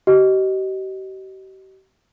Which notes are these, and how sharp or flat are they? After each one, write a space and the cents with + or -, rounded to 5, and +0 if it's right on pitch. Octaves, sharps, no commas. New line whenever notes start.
G4 -40 D#5 +0